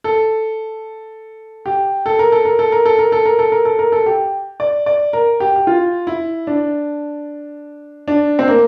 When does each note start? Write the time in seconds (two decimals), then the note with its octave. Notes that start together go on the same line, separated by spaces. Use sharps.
0.04 A4
1.66 G4
2.06 A4
2.19 A#4
2.32 A4
2.45 A#4
2.59 A4
2.72 A#4
2.86 A4
2.99 A#4
3.12 A4
3.25 A#4
3.39 A4
3.52 A#4
3.65 A4
3.79 A#4
3.92 A4
4.06 G4
4.60 D5
4.86 D5
5.13 A#4
5.40 G4
5.56 G4
5.67 F4
6.07 E4
6.47 D4
8.08 D4
8.39 C4
8.48 A#3